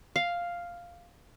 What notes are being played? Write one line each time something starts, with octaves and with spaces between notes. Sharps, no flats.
F5